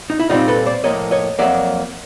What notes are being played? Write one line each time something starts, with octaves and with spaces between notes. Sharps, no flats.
D#4
E4
A#2 G3 C4 D#4 F4
A4 B4
C5 D5
A2 F3 A#3 C#5 D#5
C#5 D#5
F2 C#3 F#3 A#3 D5 E5